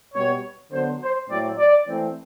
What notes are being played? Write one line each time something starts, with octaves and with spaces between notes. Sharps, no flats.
B2 G3 B3 C#5
D3 F#3 B3 C5
C5
A2 F#3 A3 C4 D5
D5
E3 A3 C4